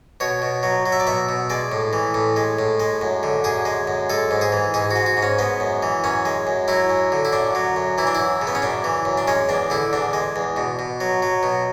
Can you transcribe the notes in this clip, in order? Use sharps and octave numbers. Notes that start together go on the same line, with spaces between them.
B2 C#5
B2
F#3
F#3
E5
D5
B2 E5
B2
G#3 D5
A2
E3
A2
G#3
A2
G#3
F#2
D3
F#2 G#4
G#3
F#2
G#3 A4
G#2
G#4
E3
G#2 G#4
G#3 F#4
F#4
G#2
C#4
G#3 B3
F#2
E3
F#2 C#4
G#3
F#2
F#3 E4
F#2
D3
E4
F#2 D4
F#3
F#2
E3 E4
D4
F#2 E4
C#3
B3
C#4
F#2 D4
E3
F#2
D4
G#3 C#4
E2 D4
D3 E4
E2 D4
G#3
E2
B2
B2
F#3
F#3
B2